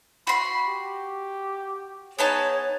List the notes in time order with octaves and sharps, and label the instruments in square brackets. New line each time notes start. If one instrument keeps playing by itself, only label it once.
[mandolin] F#4 C6 [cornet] B5
[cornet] G4
[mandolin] B3 D#4 A5 [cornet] G#4 [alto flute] C#5